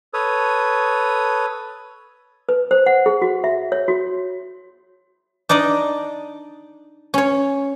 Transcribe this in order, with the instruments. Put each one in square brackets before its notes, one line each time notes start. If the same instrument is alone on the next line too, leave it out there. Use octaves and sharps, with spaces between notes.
[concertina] A4 B4 C#5 D#6
[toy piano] B4
C5
F#5
G#4
F#4
E5
C#5
F#4
[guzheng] D4 D#4 D5 D#5
C#4 C#5